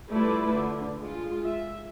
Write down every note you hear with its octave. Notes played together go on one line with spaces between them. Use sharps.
G3 A3 E4 F4 B4 D5
D3
G#3 F4
E5